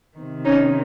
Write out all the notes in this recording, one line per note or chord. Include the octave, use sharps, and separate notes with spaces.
C3 D#3
C#4 D#4